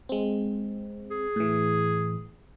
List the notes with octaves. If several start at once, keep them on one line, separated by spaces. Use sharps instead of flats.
G#3 C4
G#4
A2 E3